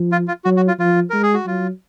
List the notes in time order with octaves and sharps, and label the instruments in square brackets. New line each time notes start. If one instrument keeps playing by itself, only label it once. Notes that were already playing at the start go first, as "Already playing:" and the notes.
Already playing: [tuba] F3
[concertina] F4
F4
[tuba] F#3 [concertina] F#4
[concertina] F#4
F4
[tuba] F3 [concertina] F4
[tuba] G#3 [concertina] A#4
[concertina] G#4
F#4
[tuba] F#3 [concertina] F4